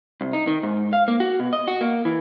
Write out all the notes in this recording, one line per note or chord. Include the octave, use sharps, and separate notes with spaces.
C2
D#4
D#3
G#2
F5
A#3
F#4
B2
D#5
F#4
A#3
E3